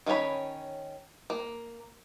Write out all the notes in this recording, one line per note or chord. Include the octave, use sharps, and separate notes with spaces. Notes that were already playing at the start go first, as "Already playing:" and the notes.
D#3 C#4 F4 C#5 B5
A#3